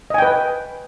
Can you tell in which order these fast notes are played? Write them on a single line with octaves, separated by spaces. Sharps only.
D#5 G#5 G5 B4